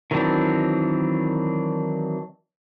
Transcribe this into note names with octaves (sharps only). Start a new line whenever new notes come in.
D#3 E3 F#3 C4 D4